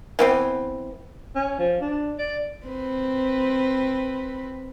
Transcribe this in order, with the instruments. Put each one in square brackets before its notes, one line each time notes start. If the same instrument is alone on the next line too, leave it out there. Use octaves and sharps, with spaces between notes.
[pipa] E3 B3 C4
[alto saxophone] C#4
F3
D4
D5
[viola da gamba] C4 B4